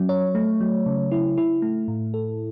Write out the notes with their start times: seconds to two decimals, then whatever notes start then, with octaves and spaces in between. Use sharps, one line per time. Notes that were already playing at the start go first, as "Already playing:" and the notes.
Already playing: F#3 C#4
0.09 C#5
0.35 A3
0.61 F#3
0.86 C#3
1.12 E4
1.38 E4
1.62 A3
1.88 A2
2.14 A4